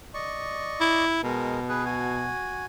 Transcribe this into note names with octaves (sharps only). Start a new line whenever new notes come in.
D5 D#5 C#6
E4
B2 G#3 A#4
G#4 B4
F#4 G#5